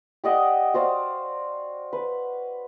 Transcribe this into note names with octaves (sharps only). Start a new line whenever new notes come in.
G4 D5 D#5 F#5
F#4 C5 D5 F5
B4